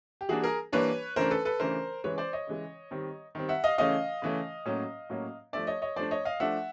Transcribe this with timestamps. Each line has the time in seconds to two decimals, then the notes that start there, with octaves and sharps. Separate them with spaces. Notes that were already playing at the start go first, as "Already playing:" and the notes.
0.21 G4
0.29 E3 G3 A#3 D4 F#4 G#4
0.44 G#4 A#4
0.72 E3 G3 A#3 D4 B4 C#5
1.16 C#3 E3 A3 D4 A#4 C5
1.31 A4 B4
1.45 A4 B4
1.60 C#3 E3 A3 D4 A#4 C5
2.04 C#3 E3 G#3 B4 C#5
2.18 C5 D5
2.33 C#5 D#5
2.47 C#3 E3 G#3
2.91 D#3 G3 C4
3.35 D#3 G3 C4
3.49 E5 F#5
3.64 D#5 F5
3.78 C#3 E3 A3 C#4 D#5 F5
4.22 C#3 E3 A3 C#4
4.65 A2 F#3 A#3 C#4
5.09 A2 F#3 A#3 C#4
5.53 F3 A3 D4 D5 E5
5.67 C#5 D#5
5.82 C#5 D#5
5.96 F3 A3 D4 C5 D5
6.11 C#5 D#5
6.25 D#5 F5
6.40 F3 A3 D4 E5 F#5